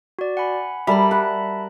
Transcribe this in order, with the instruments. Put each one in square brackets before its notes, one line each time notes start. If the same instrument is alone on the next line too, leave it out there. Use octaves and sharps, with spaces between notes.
[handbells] F#4 D5
F#5 G#5 B5
[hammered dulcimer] G3 A#4 [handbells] E5 A5 B5
[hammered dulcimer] F#5